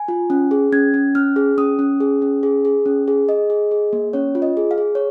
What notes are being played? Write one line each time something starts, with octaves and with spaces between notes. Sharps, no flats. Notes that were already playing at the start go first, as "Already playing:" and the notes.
Already playing: G#5
F4
C#4
G#4
C#4 G#6
C#4
C#4 F6
G#4
C#4 D#6
C#4
G#4
C#4
G#4
G#4
C#4
G#4
G#4 D#5
G#4
G#4
A#3
C#4 C#5
F4
D#5
G#4
F5
G#4
C#5